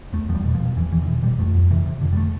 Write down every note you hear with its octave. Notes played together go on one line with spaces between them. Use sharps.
E2 A3
E2 F3
G3
B2
F3
B2
E2 E3
E2 E3
D3
B2 E3
B2 G3
F2 A3
F2
C3 E3
C3
F2 D3
G3
A3